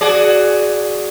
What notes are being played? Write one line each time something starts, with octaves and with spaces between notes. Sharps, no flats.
F#4 G#4 D5